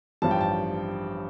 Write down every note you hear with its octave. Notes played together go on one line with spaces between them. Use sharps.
A1 G2 F3 A5
G5
A5